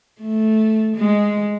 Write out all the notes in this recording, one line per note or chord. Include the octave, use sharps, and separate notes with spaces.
A3
G#3